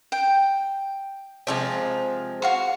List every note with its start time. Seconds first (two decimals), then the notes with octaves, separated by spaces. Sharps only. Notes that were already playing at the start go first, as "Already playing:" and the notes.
0.12 G5
1.47 C3 F3 G#3
2.42 F#4 F5 C#6